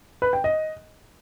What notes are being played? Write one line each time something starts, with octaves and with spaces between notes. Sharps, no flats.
B4
G5
D#5